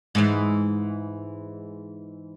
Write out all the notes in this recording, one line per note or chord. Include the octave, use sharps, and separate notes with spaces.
G#2 E3